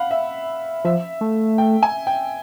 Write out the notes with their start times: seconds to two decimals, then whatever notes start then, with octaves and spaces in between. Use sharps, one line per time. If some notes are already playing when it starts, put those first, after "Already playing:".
Already playing: F5 F#5 B5
0.11 E5
0.84 F3 E5
1.21 A3
1.58 G5
1.83 G#5
2.07 G5